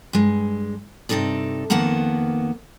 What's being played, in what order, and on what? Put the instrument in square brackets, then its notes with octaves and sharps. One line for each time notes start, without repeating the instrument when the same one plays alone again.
[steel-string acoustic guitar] G2 G#3
G2 C3 F3 D#4 A4 D5
F2 D#3 A#3 B3 F#5 A5